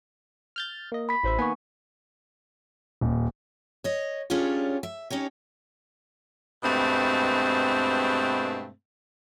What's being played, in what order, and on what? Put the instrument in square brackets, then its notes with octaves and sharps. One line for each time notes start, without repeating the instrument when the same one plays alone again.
[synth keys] F6 G6 A6
A#3 D#5
[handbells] B5 B6
[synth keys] A1 C5 E5
[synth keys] D#3 B3 G#5 [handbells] A#3 C#6
[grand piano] D#1
[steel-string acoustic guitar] C#5 D#5
C#4 D4 F4 G4 G#4 C#5
E5
C#4 D#4 G4 C#5
[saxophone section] G2 B2 G#3 A3 C4